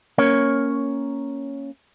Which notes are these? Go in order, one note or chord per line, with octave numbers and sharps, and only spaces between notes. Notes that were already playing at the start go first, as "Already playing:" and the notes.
A#3 C#4 A#4 C#5